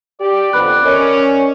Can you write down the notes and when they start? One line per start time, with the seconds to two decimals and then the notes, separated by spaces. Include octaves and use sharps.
0.21 G4 D5
0.53 F2 D3 B3 B4 B5 F#6
0.84 C#4 A#4 C#5 D#5